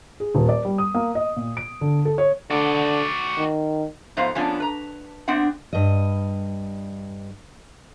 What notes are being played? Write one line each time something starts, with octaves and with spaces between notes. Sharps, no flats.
G#4
D#1
D5
G3
D#6
A#3
D#5
A#2
D7
D3
A4
C#5
D3 F#4 D5
D#3
G#2 F3 B3 C5 F5
F3 A#3 B3 C#4 D4
B4 A#5
B3 C4 D4 F#5
G2 D#5